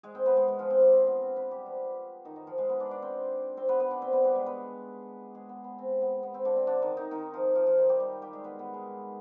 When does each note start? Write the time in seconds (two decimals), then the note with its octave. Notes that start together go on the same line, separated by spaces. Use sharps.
0.03 G#3 G#4
0.15 C4 C5
0.26 B3 B4
0.37 G#3 G#4
0.48 G#3 G#4
0.59 F3 F4
0.70 C4 C5
0.81 D3 D4
0.92 C4
1.07 B3
1.22 C4
1.36 B3 B4
1.51 G3 G4
1.66 F3 F4
2.25 D#3 D#4
2.36 D#3 D#4
2.47 F3 F4
2.58 G#3 G#4
2.69 B3 B4
2.80 D4 D5
2.91 D4 D5
3.02 C4 C5
3.57 C4 C5
3.69 B3 B4
3.80 B3 B4
3.91 D4 D5
4.02 C4 C5
4.13 B3 B4
4.24 G3 G4
4.35 G#3 G#4
4.46 B3 B4
5.35 G#3 G#4
5.49 B3
5.64 B3
5.79 C4
6.01 B3
6.23 B3
6.34 C4
6.45 D3 D4
6.56 C4
6.67 D3 D4
6.82 D#3 D#4
6.97 D#3 D#4
7.11 D#3 D#4
7.34 F3 F4
7.55 F3 F4
7.67 F3 F4
7.78 D#3 D#4
7.89 G3 G4
8.00 G3 G4
8.22 G3 G4
8.33 G#3 G#4
8.44 B3 B4
8.59 B3 B4
8.74 G#3 G#4